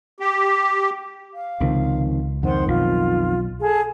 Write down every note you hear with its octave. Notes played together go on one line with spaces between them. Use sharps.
G4
F5
C#2 C3 D#3 F3
F2 D#3 C5 F#5 C6
B1 F4
G#4 A4 A5